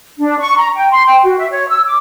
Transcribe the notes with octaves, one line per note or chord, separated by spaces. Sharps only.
D4
C#6
A#5
G5
C6
G5
F#4
E5
C#5
E6
D6